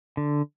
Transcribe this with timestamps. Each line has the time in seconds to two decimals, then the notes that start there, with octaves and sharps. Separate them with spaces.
0.17 D3